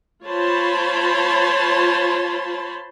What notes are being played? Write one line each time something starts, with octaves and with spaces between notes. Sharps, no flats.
F4 C5 C#5 A5 B5 C6